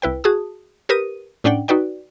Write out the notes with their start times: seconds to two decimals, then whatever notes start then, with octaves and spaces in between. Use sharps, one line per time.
0.02 C2 E4 B4 G5
0.24 F#4 G#4 A5 D#6
0.89 G4 A#4 B4 D#6 D#7
1.44 A2 C#4 D4 D5 F#5 G5
1.68 D#4 F#4 B4 D5 G5